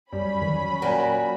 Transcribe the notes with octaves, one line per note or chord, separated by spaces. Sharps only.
F#2 F#3 G3 C#4 B5
F2 D#3 E3
A#2 F#4 G4 A#4 G#5